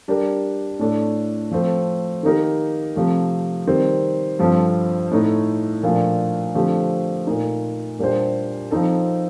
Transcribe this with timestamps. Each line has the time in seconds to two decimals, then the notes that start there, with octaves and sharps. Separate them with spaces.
0.08 G3 D4 G4 A#4
0.79 A2 A3 D4 A4
1.51 F3 A3 C4
2.23 D#3 A#3 D#4 G4 A#4
2.96 C3 F3 A3
3.67 D#3 G3 C4
4.39 G2 F3 C4 F4 A4
5.11 A2 A3 D#4
5.83 A#2 F3 A3 D4 F4
6.55 D3 F3 A3 C4 G4
7.27 A#2 A3 D#4
7.99 A#2 G3 D4 G4 C5
8.71 F3 C4 D#4 A4